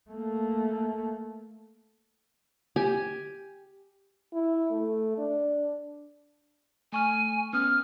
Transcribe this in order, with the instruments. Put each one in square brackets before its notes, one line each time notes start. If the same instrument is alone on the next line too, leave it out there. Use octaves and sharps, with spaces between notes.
[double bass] A3 A#3
[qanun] G4 G#5
[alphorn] E4
A3
D4
[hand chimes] A3 C#6 F6 [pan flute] G#5
[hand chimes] B3 C#4 D#6 [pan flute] F6